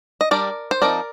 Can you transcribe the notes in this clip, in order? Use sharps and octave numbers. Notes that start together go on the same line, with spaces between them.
D#5
G3 D4 A#4 D5
C5
F3 C4 D#4 A#4 D5